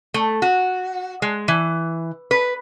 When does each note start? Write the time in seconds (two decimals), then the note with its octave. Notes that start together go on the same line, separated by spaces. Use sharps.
0.14 A3
0.42 F#4
1.22 G#3
1.48 E3
2.31 B4